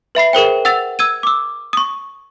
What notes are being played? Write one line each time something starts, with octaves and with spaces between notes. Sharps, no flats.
B4 E5 B5 C7
G#4 A#4 C5 G5
F#5 E6 A6 F7
E6 G#6 D#7
D6 E6
C#6 D#6